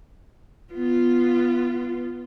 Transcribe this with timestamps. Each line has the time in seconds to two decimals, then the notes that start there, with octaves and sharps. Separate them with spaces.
0.73 B3 F4